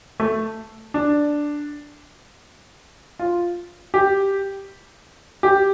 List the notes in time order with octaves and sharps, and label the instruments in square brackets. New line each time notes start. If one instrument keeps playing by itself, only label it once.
[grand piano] A3
D4
F4
G4
G4